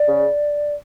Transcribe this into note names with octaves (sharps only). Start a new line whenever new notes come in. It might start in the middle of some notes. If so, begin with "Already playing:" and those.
Already playing: D5
C#3